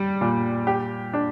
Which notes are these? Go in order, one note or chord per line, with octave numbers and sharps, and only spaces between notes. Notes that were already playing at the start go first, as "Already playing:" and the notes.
Already playing: G3
A#2
G4
D4